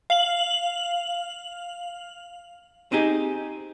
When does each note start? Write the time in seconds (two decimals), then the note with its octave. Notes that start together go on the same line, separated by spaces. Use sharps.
0.10 F5 F#7
2.92 C4 D#4 G4 G#4